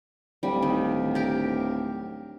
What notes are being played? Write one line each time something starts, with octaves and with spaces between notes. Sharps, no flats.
D1 G3
D#3
G4 A#4